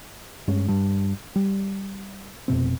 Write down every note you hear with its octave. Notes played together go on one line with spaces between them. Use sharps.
G2 G#3 C#4
G2
G3
F1 B2 C4